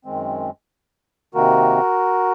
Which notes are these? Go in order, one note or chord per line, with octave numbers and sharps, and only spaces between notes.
F#2 D#3 G#3 C4
C3 D#3 A#3 F#4 A#4